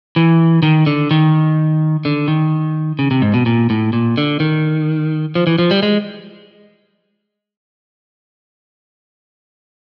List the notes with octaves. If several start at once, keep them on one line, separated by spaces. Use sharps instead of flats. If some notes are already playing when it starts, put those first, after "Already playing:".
E3
D#3
D3
D#3
D3
D#3
C#3
C3
G#2
B2
A#2
A2
A#2
D3
D#3
F3
E3
F3
G3
G#3